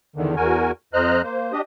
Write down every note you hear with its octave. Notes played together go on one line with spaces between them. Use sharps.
E2 D3 D#3
E2 F#4 A#4 G#5
F2 C5 D#5 A#5 F6 F#6
A#3 C5
D4 G4 D#5 D#6